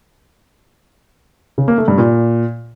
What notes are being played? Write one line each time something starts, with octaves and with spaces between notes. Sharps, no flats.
C#3
A#3
A3
G2
A#2